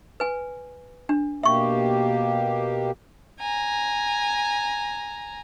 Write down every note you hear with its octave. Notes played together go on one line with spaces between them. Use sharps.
B4 G#5
D4
B2 A#3 G4 E5 C#6
G#5 A#5